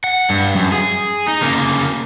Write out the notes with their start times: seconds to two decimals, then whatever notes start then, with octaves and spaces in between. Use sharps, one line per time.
0.04 F#5
0.30 G2
0.56 F#2
0.72 G#4
1.28 D#4
1.42 C#3 A#3